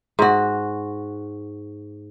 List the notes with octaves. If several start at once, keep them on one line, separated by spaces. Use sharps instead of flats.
G#2 F#4